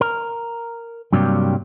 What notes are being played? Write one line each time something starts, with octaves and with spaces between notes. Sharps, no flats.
A#4
G2 C3 F#3 G3 A#3 G4